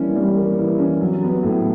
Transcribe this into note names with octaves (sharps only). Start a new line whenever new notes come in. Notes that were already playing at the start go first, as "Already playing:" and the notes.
Already playing: E3 G3 A#3 C#4
G3
A#3
E3
C#4
F#3
B3
A2